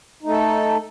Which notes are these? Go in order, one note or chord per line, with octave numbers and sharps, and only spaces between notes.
A3 D#4 A4